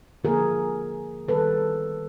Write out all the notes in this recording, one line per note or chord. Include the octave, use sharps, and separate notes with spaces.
D3 F3 A#3 G#4 A#4
D#3 G3 B3 A4 B4